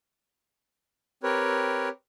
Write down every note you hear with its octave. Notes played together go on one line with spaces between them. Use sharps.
C4 G4 A#4 B4 C#5